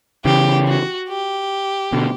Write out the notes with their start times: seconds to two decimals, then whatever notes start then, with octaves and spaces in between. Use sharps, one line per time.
0.25 C#3 E3 G4
0.68 F#4
1.09 G4
1.92 B2 D3